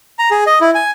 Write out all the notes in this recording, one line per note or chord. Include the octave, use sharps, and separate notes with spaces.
A#5
G#4
D#5
E4
G#5